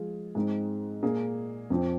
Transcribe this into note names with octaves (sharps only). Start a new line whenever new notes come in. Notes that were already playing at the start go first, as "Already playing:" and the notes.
Already playing: F3 G#3 F4 G#4
G#2 G#3 C4 D#4
A#2 A#3 G#4
F2 F3 C4